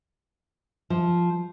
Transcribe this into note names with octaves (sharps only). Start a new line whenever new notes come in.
F3